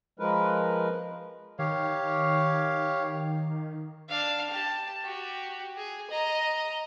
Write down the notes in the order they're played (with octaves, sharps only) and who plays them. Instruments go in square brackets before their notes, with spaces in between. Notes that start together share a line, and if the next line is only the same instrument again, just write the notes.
[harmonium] F3 G#3 A#4 B4
[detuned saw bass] D#3 [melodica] G4 C#5 F5
[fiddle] D4 F5
G4 A5
F#4 G4
G#4
D#5 A#5